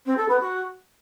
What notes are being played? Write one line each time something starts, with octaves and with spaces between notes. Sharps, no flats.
C4
A4
B3
F#4